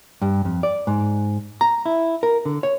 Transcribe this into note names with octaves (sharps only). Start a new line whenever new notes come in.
G2
F2
D5
G#2
A#5
E4
A#4
D3
C#5